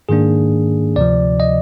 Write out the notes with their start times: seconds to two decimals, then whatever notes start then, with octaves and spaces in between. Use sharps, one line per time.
0.09 G#2 D#3 A#3 D4 G#4
0.96 D2 C3 F3 D5
1.40 D#5